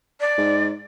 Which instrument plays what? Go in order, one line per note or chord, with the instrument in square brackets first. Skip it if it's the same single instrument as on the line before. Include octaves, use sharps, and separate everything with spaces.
[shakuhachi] D5
[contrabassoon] G#2